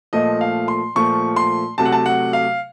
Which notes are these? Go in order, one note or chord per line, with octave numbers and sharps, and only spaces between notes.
A#2 F3 A3 D#5
F5
C6
A#2 F3 A3 C#6
C6
C3 F#3 A3 A5
F#5
A5
F#5
F5